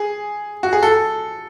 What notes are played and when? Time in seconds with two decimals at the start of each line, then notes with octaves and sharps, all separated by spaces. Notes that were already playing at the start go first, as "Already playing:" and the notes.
Already playing: G#4
0.63 F#4
0.73 G#4
0.83 A4